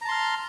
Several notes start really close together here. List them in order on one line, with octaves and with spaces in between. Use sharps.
A#5 A5 C6 F6